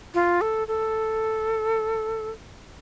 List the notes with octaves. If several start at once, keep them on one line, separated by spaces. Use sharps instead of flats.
F4
A4
A4